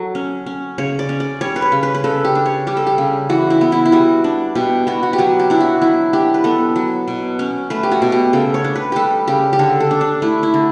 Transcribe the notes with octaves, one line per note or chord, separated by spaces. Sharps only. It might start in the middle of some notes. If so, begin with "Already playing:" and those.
Already playing: F#3 A4
C#4
C#4
C#3 C#5
D5
C#4
D5
G3 C#5
B4
C#5
C#3
B4
B4
C#3 A4
G4
D4
C#5
G3 G4
A4
G4
C#3
E3 F#4
E4
B3
E4
E4
G3 F#4
D4
B2 G4
B3 F#4
F#4
G4
F#3 F#4
G4
D4 E4
F#4
F#3 E4
D4 G4
B4
B3 A4
F#3
B2
C#4
A3 B4
G4
F#4
B2
G4
C#3 A4
C#5
D4
B4
G3 G4 A4
C#3 G4
G4
D3 A4
A4
D4
D4
A3 E4
E4
D3